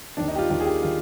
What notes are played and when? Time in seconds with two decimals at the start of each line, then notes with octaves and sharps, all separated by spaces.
0.17 D#2 D#3 D4
0.28 D#4
0.35 G4
0.38 F4
0.50 D#2 D#3 G4
0.60 G#4
0.66 G4
0.83 D#3 F4